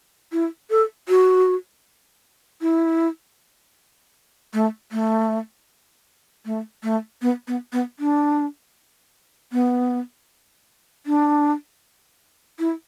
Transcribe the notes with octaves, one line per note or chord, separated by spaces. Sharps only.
E4
A4
F#4
E4
A3
A3
A3
A3
B3
B3
B3
D4
B3
D4
E4